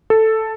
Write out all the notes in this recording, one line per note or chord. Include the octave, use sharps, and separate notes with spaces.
A4